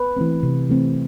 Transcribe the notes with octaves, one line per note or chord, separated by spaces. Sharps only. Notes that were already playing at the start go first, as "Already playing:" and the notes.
Already playing: B4
E3 A3 C4
C3
E3 A3 C4